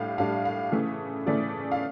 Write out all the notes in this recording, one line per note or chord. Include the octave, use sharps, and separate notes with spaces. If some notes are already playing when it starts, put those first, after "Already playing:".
Already playing: A2 G3 D4 F5
A2 G3 D4 F5
F5
C#3 E3 A3
C#3 E3 A3 D5
F5